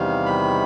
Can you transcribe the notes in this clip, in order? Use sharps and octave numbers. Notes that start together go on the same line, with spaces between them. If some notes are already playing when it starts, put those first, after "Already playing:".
Already playing: E2 C3 D#3 G3 F5
B5